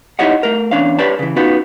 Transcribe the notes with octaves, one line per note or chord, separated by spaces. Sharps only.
D#4 E4 G4 C#5 D#5 F#5
A3 A#4
E2 C#4 D4 C#5 F5
G4 B4 C#5 D5 A5
C#3 E3
B3 C#4 D#4 F4 F#4 B4